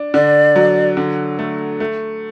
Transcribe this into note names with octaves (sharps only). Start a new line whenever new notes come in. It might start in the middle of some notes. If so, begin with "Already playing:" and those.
Already playing: D4
D3 D5
F#3
D3
A3
A3